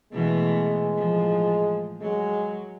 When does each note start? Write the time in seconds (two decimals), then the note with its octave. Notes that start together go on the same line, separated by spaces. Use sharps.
0.12 B2 E3 G#3 A3
0.96 A2 F3
2.01 F#3 G#3